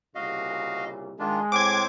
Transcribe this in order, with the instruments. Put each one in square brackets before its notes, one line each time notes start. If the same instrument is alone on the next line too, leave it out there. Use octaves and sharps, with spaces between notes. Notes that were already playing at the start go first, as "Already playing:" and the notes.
[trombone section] C2 A#2 C#3 [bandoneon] F#4 D#5 F5
[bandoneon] D#3 D4 F4 [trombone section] G#3
[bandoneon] A2 C4 C5 [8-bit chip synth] D6 G#6